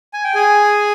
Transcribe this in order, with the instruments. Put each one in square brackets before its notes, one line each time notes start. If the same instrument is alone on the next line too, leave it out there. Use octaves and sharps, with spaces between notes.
[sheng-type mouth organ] G#5
G5
G#4 G#5